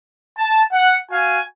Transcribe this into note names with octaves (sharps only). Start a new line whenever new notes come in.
A5
F#5
F#4 F5 G#5